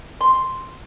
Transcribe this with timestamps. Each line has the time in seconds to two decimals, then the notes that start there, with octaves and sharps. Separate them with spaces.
0.21 C6